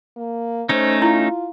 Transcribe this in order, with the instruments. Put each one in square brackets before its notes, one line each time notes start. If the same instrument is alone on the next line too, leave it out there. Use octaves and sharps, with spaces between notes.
[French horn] A#3
[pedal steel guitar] A3 C#4 D#4 [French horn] C5
[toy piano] E4 [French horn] F4